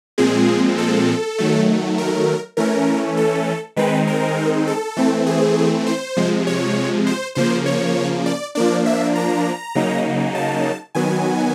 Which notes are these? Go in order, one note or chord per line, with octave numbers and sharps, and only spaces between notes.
A#2 F3 G#3 C4 G#4
A4
D#3 F#3 A3
A#4
E3 A3 C#4 A#4
A4
D#3 G#3 C4 D#4 B4
A#4
A4
E3 A3 C4
G#4
C5
C3 F3 G#3
C#5
C5
C#3 F3 A#3 C5
C#5
D5
F3 A#3 D4 D5
E5
A#5
C#3 F#3 A#3 D#4
A5
D#3 F#3 B3 G#5